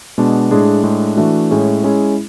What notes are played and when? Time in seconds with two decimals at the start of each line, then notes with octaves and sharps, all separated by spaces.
0.18 B2 G#3 B3 D4
0.51 A2 G#3 D4 G#4
0.83 A2 G#3 D4
1.17 E3 A3 D4 F#4
1.51 A2 G#3 C#4 G#4
1.84 G#3 C#4 E4 G#4